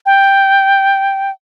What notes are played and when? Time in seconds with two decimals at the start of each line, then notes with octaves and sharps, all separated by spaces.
0.06 G5